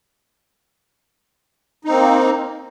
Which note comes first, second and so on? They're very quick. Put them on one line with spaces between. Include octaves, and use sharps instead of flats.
D#4 C4 A#3